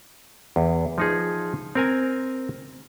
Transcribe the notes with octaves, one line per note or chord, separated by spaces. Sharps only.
E2
F3 D#4 G#4
C4 A#4 G#5